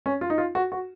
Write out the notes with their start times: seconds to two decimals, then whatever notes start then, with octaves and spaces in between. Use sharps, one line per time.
0.06 C#4
0.21 F4
0.30 D#4
0.38 F4
0.55 F#4
0.72 F#4